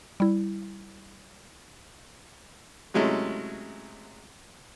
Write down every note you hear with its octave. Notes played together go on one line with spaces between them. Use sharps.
G3 E4
C3 F#3 G#3 A3 C#4 E4